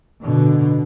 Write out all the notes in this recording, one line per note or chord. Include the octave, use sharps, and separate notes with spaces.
B2 D3